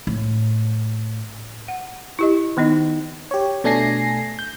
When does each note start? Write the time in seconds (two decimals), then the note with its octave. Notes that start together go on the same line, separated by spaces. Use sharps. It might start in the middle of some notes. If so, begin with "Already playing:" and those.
0.07 A2
1.68 F#5
2.19 E4 G4 D#5
2.57 D#3 B3 D#4 D#5
3.31 G4 C#5
3.64 B2 A3 D4 G#5 A#6 C7
4.39 G6